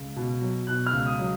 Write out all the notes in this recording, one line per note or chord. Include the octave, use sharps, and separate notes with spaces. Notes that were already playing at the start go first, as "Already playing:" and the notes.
Already playing: C#2
B2
F#3
B2 F#6
F6
C#2
D#6
F#3